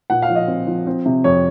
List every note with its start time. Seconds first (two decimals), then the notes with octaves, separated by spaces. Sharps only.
0.10 A#2 F#5
0.22 F5
0.30 F3
0.35 D#5
0.48 C4
0.67 F3
0.87 C4
1.06 C3
1.24 F2 C#5